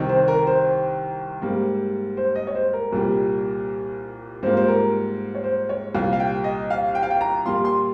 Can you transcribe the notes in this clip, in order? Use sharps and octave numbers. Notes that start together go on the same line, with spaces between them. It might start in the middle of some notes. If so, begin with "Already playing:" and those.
Already playing: C2 C3 D#3
C5
A#4
C5
G#2 G3 A#3
C5
D#5
C#5
C5
A#4
C2 A#2 G3
G#2 G3 A#3 F4 C5
C5
A#4
C#5
C5
C#5
C2 A#2 G3 F5
F5
G5
D#5
F5
G5
F5
G5
A#5
A#2 G3 A#3 F4 C6
C6